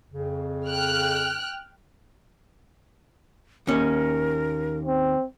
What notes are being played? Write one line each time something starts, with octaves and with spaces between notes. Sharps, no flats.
F2 C#3
G5 F6 F#6
D#2 C#4 A#4
C4